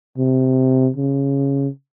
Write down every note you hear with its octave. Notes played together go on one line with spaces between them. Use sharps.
C3
C#3